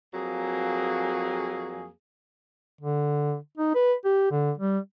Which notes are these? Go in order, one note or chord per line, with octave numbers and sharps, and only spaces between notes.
F2 F#3 A#3 G#4
D3
D#4
B4
G4
D3
G3